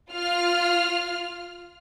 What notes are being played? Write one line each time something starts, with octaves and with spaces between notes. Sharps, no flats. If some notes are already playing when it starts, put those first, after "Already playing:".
F4 F6